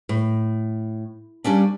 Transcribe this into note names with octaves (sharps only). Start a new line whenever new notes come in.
A2
G3 A#3 C#4 D4